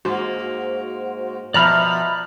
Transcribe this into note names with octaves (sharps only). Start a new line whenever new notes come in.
G#2 A#3 F#4 C5
B2 F3 D5 E5 A#5 B5 F6 F#6